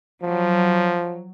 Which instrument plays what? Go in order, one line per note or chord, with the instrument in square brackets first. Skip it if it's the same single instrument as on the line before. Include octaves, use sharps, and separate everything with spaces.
[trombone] F3 [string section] F#3